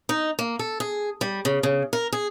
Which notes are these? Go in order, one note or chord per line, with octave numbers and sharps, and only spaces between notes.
D#4
A#3
A4
G#4
G3
C#3
C#3
A#4
G#4